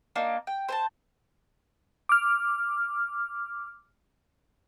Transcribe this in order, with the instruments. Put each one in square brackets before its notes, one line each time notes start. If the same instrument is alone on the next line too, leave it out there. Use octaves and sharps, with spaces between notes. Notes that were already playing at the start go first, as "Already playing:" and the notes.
[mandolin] A#3 D4 D#4
G5
C5 G#5 A5
[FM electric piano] D6 F6